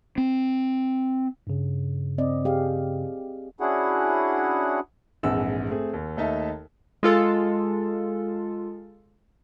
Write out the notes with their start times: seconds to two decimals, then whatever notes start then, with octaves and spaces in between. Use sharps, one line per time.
0.18 C4
1.47 G2 C#3
2.18 C4 D5 D#5
2.45 G4 G#4 F5
3.60 C#4 D4 E4 F#4 G#4 F#5
5.23 A#1 F2 G#2 E3 F#5 E6
5.70 A3 C4 G#4
5.93 D#2
6.17 D#2 A3 D#4 A4 E5 A5
7.03 G#3 F4 A4